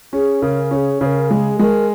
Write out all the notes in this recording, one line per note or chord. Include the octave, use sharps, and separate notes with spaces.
C#4 G#4
C#3 A#4
C#4 A#4
G#4
C#3 C#5
A#4
G#3 G#4
G#3 A#4